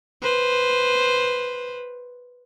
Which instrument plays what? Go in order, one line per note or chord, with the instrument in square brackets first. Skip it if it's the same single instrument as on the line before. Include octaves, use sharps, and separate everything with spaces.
[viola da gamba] B4 C5